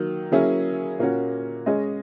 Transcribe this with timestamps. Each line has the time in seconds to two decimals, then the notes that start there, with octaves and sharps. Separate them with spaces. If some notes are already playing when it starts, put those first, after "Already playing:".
Already playing: D#3 F#3 A#3
0.32 F#3 A#3 C#4 E4 G#4
0.99 A#2 A#3 C#4 F#4
1.66 G#3 C#4 G#4 D#5